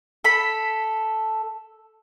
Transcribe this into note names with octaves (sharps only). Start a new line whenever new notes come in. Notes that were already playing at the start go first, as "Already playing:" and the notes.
A4 B5